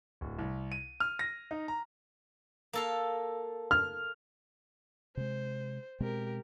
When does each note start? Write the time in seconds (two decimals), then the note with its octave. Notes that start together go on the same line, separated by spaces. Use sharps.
0.21 D1
0.38 C2
0.72 D#7
1.00 F6
1.19 A#6
1.51 D#4
1.68 A#5
2.73 A#3 A4 F5
3.71 F6
5.17 C3 G#3 C5
6.00 B2 G#3 C4 G4 A#4